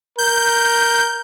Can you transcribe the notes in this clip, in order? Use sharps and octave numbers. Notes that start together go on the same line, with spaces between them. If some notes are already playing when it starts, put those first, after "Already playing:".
A#4 G6